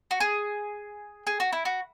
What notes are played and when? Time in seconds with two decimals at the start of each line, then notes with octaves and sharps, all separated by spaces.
0.11 F#4
0.20 G#4
1.27 G#4
1.40 F#4
1.53 E4
1.65 F#4